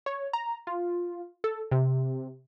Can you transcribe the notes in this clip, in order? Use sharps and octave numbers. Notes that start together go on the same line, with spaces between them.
C#5
A#5
F4
A4
C3